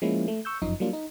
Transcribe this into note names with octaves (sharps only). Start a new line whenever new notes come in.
F3 G#3 A#3 C#4 E4
A3
C#6 E6 G6
G1 F#2 F3 D#4
F#3 G3 A#3 D4 F4
D#4